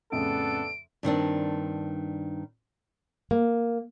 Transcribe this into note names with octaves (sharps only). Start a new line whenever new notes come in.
F2 A2 C#3 B3 D4 A4 D7
G2 D#3 C4 D4
A#3